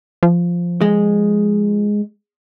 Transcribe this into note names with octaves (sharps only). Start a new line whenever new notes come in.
F3
G#3